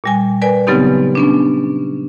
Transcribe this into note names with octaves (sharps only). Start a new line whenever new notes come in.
A#2 G3 G#5
A#4 B4 D5 G#5
C#3 F#3 B3 C4 D#4 G4
B3 C#4 D4